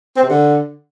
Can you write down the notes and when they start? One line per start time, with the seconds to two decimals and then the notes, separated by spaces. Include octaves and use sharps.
0.17 C4
0.23 C3
0.30 D3